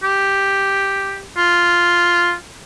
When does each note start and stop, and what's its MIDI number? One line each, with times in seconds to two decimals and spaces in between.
0.03 1.20 67
1.37 2.32 65